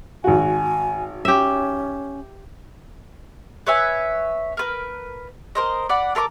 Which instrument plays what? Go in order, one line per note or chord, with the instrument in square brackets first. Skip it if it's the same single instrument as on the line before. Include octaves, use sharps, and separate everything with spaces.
[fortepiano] G#1 F#4 [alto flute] G#5
[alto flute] C#4 [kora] G4 E5
[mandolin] B4 C#5 E5 G#5
A#4 B4
A#4 C5 D#5
D5 F#5 B5
A4 A#4 B5 D6